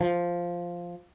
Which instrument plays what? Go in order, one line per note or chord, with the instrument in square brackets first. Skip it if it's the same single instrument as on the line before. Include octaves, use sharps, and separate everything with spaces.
[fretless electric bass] F3